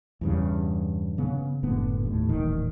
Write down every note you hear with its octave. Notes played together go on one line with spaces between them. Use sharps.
E2 G2 C#3
C#3 B3
F#1 A2 D3 B3
D#2 A2
D#1 A1 D#3